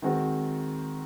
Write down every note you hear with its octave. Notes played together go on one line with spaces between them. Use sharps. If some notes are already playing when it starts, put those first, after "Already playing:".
D#3 G#3 C4 F#4